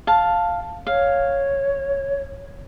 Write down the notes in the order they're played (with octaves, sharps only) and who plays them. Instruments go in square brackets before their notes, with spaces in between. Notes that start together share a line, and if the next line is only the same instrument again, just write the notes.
[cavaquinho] F5 A5
[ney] C#5 [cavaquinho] F5